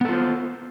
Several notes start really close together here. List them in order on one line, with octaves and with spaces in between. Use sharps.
B3 A4 F4 C5